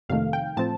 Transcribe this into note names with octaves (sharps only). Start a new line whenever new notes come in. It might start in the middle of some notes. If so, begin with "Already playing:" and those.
F2 C3 D#3 A3 F5
G5
A2 F3 C4 A5